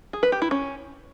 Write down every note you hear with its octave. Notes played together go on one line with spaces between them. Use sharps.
G#4
B4
G4
E4
C#4